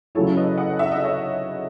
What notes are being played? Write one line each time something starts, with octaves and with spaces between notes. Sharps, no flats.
C#3 F#3 C#4 E4 A4 C#5
B4 D#5
D#5 F#5
E5
D#5
C#5 E5